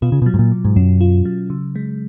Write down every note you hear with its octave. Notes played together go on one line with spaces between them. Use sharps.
B2 F4
C#3
B2
F#3
G#2
A#2
B2
G#2
F#2 C#4
F4
F#3
C#3
G#3